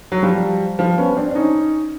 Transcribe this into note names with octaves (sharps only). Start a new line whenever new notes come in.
F#3
F3 G3
F3 G3
B3 C#4
C4 D4
D4
C#4 D#4